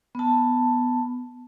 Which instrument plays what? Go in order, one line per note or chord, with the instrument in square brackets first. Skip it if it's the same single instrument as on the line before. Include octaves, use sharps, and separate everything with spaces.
[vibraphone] B3 A5